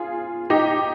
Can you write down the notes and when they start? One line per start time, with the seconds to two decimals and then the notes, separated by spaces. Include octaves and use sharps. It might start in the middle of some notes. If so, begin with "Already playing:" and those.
Already playing: F4 G#4
0.50 D#4 G4